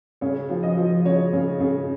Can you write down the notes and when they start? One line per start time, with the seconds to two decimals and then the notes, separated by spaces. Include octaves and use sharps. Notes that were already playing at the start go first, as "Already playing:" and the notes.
0.21 C#3 C#5
0.50 F3
0.63 D#5
0.77 F3
1.05 C#3 C#5
1.33 C#3
1.60 C#3